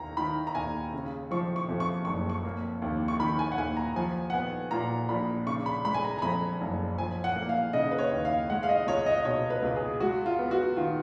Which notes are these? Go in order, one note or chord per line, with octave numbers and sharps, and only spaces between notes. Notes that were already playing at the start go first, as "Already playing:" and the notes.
Already playing: D#2 A#3 A#5
D#3 B5
A#5
D#2 G#5
C#3
F3 C#6
C#6
F2
C#6
F#1 C#6
C#6
A#3
D#2
C#6
D#3 B5
G#5
F#5
D#2 G#5
A#5
F3 G#5
F#5
B3 G#5
A#2 A#5
A#1 B5
C#3 C#6
B5
G#3 B5
G#5
A#5
A#5
F2 B5
F#1
F3 G#5
F#5
A#3
F5
C#3 D#5
B4
C#5
D#2
F5
G#3 F#5
F5
D#5
C#2 C#5
D#5
B2 C#5
B4
C#2
G#4
G#3 F#4
F4
B3
F#4
D#3 F4